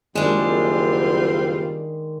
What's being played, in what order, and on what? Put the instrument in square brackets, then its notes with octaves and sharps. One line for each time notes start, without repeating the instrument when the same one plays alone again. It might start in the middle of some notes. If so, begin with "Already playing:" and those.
[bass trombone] F#1 [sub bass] D#3 [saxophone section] G3 C4 F4 [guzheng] G#3 D4